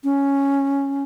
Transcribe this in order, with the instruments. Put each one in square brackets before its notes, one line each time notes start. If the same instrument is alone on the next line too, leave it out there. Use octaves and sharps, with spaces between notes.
[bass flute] C#4